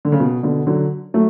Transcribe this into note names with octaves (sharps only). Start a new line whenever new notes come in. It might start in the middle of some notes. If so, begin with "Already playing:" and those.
D3
C#3
B2
B2 D3
D3 F#3
F#3 A3